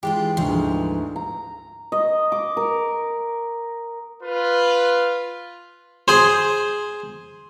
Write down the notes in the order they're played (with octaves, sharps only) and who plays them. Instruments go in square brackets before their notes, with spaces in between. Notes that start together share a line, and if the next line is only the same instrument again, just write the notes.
[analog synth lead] E3 [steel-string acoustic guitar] G#3 D4 F4 [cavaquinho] G4 D5
[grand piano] D2 G#2 D3 [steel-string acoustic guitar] F3
[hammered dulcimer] A#5
D#5
D6
A#4
[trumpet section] F4 B4
[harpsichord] G#4 C5